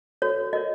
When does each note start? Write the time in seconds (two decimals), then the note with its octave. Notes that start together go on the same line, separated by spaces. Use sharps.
0.22 F#4 A4 C#5
0.53 F#4 A#4 C#5 D#5